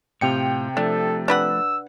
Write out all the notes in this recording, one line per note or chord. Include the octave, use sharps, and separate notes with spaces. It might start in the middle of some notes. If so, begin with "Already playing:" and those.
A2 C3 F4 G5 C#7
F3 A3 D4 A4
D4 B4 F#5 E6